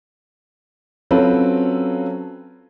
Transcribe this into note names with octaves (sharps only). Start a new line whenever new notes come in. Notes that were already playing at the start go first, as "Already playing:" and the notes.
F#3 C4 C#4 F4 A4 B4